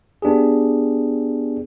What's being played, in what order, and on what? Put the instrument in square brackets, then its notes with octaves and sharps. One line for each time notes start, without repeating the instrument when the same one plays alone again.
[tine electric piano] B3 D4 G4 G#4